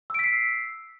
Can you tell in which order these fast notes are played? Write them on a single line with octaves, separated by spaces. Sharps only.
E6 D7 B6 C7